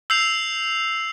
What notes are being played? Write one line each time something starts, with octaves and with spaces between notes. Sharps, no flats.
E6 G6 C7 F7